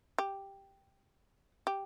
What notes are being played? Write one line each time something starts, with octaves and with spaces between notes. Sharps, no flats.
G4
G4